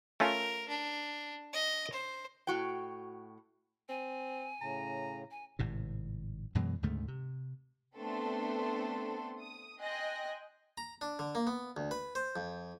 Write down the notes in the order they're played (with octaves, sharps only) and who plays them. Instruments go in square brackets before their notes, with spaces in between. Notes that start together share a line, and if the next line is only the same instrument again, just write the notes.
[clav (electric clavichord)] A3 C#4 F4 [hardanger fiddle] A#4
[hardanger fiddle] D4
D#5
C5
[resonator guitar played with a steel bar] A2 F#4 G5
[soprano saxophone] C4 [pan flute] G#5
[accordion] A2 C#3 [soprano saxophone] A#5
[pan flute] G#5
[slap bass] G#1 A2 C3
F#2 B2 E3 G#3
D2 G#2 C#3 A3
C3
[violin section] A3 B3 C4 D4 A4 C6
D#6
D#5 G5 G#5 C6 F#6 A#6
[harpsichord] A#5
D4
D3
A#3
B3
D2
B4
C5
F2